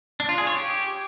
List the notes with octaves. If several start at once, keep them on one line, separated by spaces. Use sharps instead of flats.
D4
F4
G#4
C#5
G4